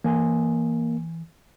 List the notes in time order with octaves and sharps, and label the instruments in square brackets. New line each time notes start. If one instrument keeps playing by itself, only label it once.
[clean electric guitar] E3 G#5 C6 [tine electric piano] A#3